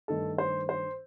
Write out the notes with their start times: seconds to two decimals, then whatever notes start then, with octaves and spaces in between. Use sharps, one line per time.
0.08 G2 D#3 A3 A4
0.38 C5
0.69 C5